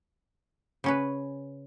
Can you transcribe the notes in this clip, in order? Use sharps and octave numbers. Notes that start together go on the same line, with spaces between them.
C#3 C#4 B4